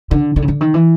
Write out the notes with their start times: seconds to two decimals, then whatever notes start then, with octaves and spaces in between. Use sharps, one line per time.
0.11 D3
0.36 D3
0.42 C#3
0.48 D3
0.61 D#3
0.74 E3